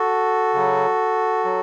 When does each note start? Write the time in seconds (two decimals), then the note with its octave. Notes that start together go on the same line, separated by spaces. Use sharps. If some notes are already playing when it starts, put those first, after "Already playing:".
Already playing: F#4 A4
0.54 C#3 F#3
1.45 F#3